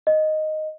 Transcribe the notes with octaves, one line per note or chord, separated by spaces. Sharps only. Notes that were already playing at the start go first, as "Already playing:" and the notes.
D#5